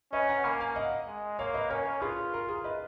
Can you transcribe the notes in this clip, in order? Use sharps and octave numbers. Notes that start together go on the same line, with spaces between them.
C#4 B4 D#5
F#5 A#5
A#3 G#5 B5
F5 G#5
D#5 F#5
G#3
A#3 C#5 F5
B4 D#5
C#4 A#4 C#5
F4 G#4 B4
A#4
G#4
B4 D#5